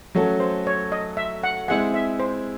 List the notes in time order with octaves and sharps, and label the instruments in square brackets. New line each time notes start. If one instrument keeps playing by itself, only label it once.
[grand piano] F#3 A3 C#4 F#4 A4
[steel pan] C5
C#5
D#5
E5
F#5
[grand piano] G#3 C4 E4 G#4 [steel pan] F#5
[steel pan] E5
C5